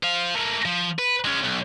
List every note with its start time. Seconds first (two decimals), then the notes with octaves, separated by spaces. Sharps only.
0.03 C5 F5
0.34 A3 A#3
0.65 F3
0.99 B4
1.25 G#3 C#4
1.44 B1